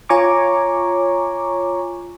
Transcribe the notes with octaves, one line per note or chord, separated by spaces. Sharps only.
F4 C#5 G#5 A#5 C#6 D6